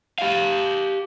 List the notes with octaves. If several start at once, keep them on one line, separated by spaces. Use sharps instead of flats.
G4 F5